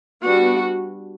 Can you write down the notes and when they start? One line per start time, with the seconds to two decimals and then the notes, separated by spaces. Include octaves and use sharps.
0.24 G3 B3 D4 F#4